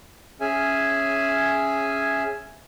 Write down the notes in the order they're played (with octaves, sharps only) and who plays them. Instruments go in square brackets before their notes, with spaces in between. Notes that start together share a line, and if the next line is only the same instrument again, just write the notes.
[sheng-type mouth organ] C#4 G#4 E5 G#5